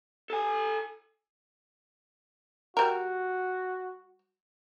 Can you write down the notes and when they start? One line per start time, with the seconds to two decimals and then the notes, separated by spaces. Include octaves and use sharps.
0.30 A4 G#5
2.77 G3 F#4 A#4